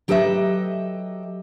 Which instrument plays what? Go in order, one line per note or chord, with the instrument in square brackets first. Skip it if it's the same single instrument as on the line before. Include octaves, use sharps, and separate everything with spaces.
[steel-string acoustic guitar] F#3 G4 A4 B4 D#5 E5